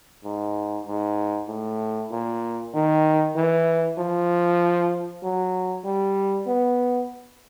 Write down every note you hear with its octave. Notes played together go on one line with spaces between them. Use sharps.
G#2
G#2
A2
A#2
D#3
E3
F3
F#3
G3
B3